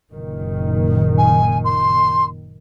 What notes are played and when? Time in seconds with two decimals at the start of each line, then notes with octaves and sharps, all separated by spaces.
0.12 F#1 A#2 D#3
1.17 G#5
1.64 C6